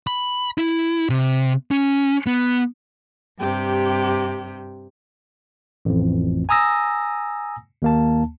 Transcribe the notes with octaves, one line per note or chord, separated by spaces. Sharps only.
B5
E4
C3
C#4
B3
G2 C3 G4
A1 F2
G#5 A#5 D#6 E6 A#6
D#2 A#3 A5